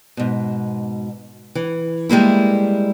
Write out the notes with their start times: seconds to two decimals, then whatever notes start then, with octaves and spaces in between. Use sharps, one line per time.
0.17 G#2 B2
1.55 E3
2.09 G3 G#3 A#3 E4